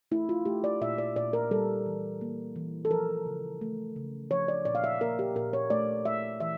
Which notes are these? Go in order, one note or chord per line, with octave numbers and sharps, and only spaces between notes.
A3 E4
F4
A3 G4
D5
A#2 E5
D5
A#2 D5
A#4
G3 A4
E3
A#3
E3
A4
F3 A#4
C#3
A3
C#3
F3 C#5
D5
A#2 D5
F5
E5
A#3 A#4
G4
A#2 A#4
C#5
A3 D5
A3 E5
E3 E5